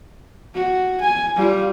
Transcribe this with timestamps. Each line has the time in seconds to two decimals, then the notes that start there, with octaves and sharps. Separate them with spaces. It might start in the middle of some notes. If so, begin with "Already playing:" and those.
0.54 F#4
1.01 G#5
1.36 G3 F4